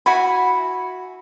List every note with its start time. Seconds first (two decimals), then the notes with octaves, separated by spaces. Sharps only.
0.06 E4 F#4 G#5 B5